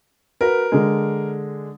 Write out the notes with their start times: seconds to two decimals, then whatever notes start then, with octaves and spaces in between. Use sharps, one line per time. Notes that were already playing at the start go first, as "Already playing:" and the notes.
0.41 F#4 A#4 B4
0.72 D3 G#3